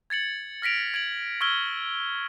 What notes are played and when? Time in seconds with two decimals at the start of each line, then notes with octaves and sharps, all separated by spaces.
0.10 G#6 A6 C#7 F#7
0.62 F6 A#6 B6 D7 F7
0.94 G#6 D7 F#7
1.41 C#6 E6 F6 G#6 G7